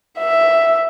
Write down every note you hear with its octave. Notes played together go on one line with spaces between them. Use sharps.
E5